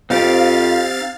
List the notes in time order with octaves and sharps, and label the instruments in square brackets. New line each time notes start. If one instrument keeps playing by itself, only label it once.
[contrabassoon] F2 [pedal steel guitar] C4 D#4 G4 [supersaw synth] F5 A6